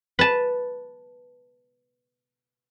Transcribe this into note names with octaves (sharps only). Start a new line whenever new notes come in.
B4 A5